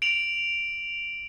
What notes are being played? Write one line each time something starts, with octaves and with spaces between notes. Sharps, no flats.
D7 F7 F#7